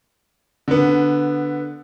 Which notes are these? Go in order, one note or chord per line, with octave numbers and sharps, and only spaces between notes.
D3 B3